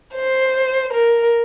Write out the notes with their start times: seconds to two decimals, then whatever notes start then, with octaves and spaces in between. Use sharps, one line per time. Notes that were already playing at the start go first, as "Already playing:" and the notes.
0.15 C5
0.93 A#4